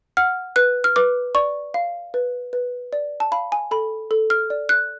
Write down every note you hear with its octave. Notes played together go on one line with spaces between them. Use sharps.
F#5 F6
B4 F#6
F6
B4 D6
D5 C#6
F5
B4
B4
D5
A5
F5 B5
G#5
A4 B5
A4
F6
D5
F#6